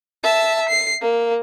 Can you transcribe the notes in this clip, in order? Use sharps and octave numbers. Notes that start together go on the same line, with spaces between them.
E5 A5
C7
A#3